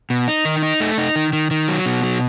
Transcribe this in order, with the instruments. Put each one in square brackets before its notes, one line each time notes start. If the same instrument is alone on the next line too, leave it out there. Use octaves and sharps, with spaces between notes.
[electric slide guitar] B2
D#4
D#3
D#4
A3
D#4
D#3
D#3
D#3
F#3
B2
F#3